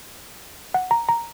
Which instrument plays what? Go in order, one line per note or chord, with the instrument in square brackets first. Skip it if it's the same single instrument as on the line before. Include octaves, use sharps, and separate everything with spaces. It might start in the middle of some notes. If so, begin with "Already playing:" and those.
[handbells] F#5
A#5
A#5